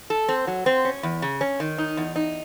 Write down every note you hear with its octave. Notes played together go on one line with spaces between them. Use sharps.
A4
C4
F#3
C4
C#4
E2
C#3
C#4
D#3
D#4
E2
D#4